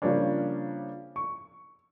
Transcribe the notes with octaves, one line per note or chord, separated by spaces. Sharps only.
C#3 F3 G3 A#3 C#4 D4
C#6